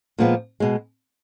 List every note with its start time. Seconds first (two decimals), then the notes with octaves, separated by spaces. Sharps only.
0.19 A#2 F3 G#3 B3
0.60 B2 G#3